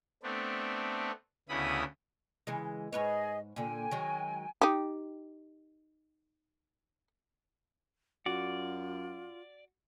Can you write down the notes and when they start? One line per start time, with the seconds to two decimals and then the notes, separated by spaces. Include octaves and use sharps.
0.23 A3 B3 C4 D4
1.49 D2 C#3 B3 E4 B5 D#6
2.47 C#3 E3 G#3
2.93 G#2 G#4 B4 C#5 D#5
3.56 A#2 D3 G5 G#5
3.91 D#3 F#3 G#3
4.61 D#4 G4
8.26 F#2 F4 F#4 D5